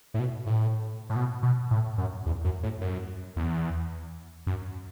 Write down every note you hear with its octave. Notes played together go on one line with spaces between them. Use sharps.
A2
B2
A2
A2
B2
B2
A2
F#2
E2
F#2
A2
F#2
E2
F#2